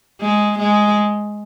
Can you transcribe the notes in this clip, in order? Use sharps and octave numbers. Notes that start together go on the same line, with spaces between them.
G#3
G#3